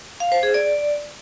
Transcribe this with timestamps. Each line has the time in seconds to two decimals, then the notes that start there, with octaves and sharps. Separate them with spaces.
0.20 F5
0.32 C5
0.43 G#4
0.54 D5